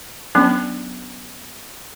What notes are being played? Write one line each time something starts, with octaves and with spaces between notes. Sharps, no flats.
F#3 B3 C#4 D4